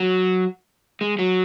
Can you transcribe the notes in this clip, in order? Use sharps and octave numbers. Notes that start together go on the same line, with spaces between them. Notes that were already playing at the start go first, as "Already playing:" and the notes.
Already playing: F#3
G#3
F#3